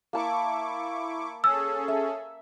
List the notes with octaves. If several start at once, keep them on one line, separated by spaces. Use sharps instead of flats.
A#3 E4 A5 C#6 D6
C#4 G#4 A4 E6
E5